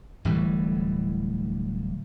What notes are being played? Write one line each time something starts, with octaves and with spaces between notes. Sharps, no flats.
D1 A2 E3 G3